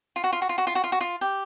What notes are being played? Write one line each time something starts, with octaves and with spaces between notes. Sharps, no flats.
F4
F#4
F4
F#4
F4
F#4
F4
F#4
F4
F#4
F4
G4